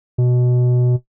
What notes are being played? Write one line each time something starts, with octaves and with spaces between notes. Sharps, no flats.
B2